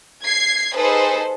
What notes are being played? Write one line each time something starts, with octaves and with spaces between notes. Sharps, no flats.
G#6 C7
D#4 G#4 A4 B4 C5